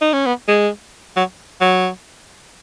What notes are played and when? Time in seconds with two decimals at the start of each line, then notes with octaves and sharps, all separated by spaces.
0.01 D#4
0.13 C#4
0.26 B3
0.48 G#3
1.16 F#3
1.61 F#3